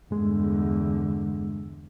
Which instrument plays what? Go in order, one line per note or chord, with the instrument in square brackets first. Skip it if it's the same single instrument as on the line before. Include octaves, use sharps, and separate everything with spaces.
[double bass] E2 D3 [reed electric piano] G2 G#3